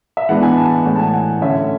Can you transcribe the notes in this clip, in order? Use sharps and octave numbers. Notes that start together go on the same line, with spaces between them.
E5
E3 G#3 B3 D4 F#5
G#5
A5
A2 E3 G#3 F#5
A5
G#5
F#5
D3 A3 C#4 E5